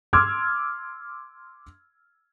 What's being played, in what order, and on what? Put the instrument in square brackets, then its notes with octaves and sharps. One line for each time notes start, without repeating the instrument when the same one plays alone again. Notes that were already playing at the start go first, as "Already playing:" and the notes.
[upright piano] C6 D6 E6 F6 G#6